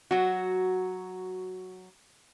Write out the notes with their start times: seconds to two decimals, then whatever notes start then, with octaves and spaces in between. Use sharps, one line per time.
0.11 F#3 F#4